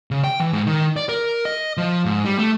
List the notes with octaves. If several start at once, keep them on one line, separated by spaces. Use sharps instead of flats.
C#3
G5
E3
G#2
D#3
D5
A#4
D#5
F3
G#2
G3
A3